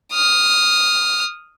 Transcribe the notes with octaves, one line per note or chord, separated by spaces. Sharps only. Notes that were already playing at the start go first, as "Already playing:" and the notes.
D#6 F6